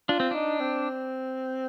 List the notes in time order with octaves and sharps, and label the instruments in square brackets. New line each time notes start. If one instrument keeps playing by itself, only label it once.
[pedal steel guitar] D4 [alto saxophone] F4
[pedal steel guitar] C4
[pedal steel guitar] D4 [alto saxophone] D#4
[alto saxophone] C4